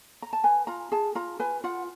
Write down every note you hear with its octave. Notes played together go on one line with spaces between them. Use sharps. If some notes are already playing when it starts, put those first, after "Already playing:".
A#5
A5
B4 G#5
F4 A#5
G#4 A5
F4 A#5
B4 G#5
F4 F#5